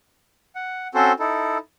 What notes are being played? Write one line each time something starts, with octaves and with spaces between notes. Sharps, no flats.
F#5
C4 C#4 F#4 A4 C5
D#4 E4 A4